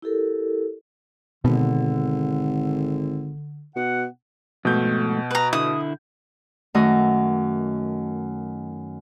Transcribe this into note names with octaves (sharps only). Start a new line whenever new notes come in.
E4 G4 A4 A#4
G#1 B2 D3
B2 F#5
F2 G#2 B2 A3 G6
B4 A#5
D3 E4 D#6
F#2 D#3 A3 F#4 D#5